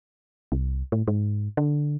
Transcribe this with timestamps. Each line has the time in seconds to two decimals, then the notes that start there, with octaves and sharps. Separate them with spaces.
0.52 C2
0.92 A2
1.08 G#2
1.57 D3